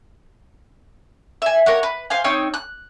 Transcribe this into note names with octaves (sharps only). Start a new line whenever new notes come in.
E5 G#5
A#4 C#5 F#5
B4
C5 F5 G#5
C4 D#4 C#5 F6
F#6